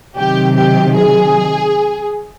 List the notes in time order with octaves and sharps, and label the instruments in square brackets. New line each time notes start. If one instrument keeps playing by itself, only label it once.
[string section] C3 D#3 F#3 G4
G4
G#4